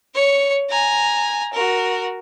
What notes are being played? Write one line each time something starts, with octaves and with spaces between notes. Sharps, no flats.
C#5 C#7
G#5 A#5
F#4 A#4